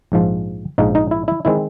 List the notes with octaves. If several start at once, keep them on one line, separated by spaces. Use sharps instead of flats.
A#1 G#2 F3
A#1 G#2 F3 D#4
D#4
E4
E4
D#3 G#3 C4 E4